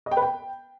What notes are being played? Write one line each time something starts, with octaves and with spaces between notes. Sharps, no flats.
D#5
G5
B4
G5